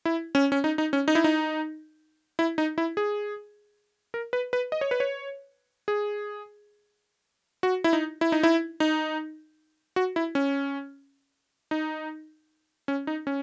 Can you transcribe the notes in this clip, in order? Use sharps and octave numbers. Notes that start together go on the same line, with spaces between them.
E4
C#4
C#4
D#4
D#4
C#4
D#4
E4
D#4
E4
D#4
E4
G#4
A#4
B4
B4
D#5
C#5
B4
C#5
G#4
F#4
E4
D#4
E4
D#4
E4
D#4
F#4
E4
C#4
D#4
C#4
D#4
C#4